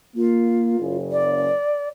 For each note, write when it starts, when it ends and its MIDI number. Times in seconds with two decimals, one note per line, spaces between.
0.16 0.78 58
0.16 0.96 65
0.80 1.49 30
0.80 1.49 49
1.11 1.88 74